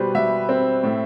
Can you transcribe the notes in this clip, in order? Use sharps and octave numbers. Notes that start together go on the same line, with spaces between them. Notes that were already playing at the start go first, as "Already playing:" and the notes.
Already playing: B2 G3 B4 C5
G3 E5
C4
A2